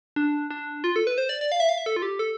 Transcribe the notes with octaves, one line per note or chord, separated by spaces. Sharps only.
D4
D4
F4
A4
B4
C5
D5
D5
F5
E5
F5
E5
A4
F4
G4
A4